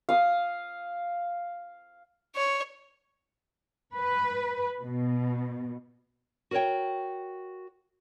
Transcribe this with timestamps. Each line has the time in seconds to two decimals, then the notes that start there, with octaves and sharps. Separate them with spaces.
0.09 F5 D#6
2.36 C#5
3.95 B4
4.83 B2
6.51 F#4 A#4 C5 C#5 G5